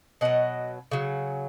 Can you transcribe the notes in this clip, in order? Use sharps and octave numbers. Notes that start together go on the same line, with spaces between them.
B2 F#3 D#5 F#5
C#3 F#3